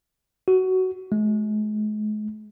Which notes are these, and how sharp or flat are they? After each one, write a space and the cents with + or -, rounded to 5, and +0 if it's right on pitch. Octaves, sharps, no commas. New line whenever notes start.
F#4 +15
G#3 +40